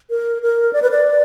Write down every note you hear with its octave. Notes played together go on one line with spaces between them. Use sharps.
A#4
A#4
D5
B4
D5